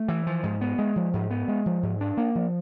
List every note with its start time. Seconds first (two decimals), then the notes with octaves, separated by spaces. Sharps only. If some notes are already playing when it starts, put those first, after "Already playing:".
Already playing: A3
0.08 E3
0.27 F3
0.43 G#2
0.61 B3
0.79 G#3
0.96 F3
1.13 G#2
1.30 B3
1.48 G#3
1.66 F3
1.83 G#2
2.01 D4
2.17 A#3
2.35 F3